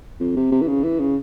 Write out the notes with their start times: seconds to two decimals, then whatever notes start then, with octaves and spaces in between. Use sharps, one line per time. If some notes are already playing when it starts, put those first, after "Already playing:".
0.20 F2
0.36 C3
0.52 C3
0.62 E3
0.68 C#3
0.84 E3
1.00 C#3